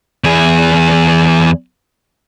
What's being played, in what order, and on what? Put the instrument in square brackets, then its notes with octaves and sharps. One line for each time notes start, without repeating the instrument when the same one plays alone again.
[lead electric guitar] E2 G#4